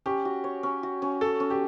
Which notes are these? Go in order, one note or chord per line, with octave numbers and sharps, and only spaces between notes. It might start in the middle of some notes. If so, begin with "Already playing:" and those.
C#4 G4
F#4
C#5
C#4
F#4
C#4
C#4 A4
C#4
G4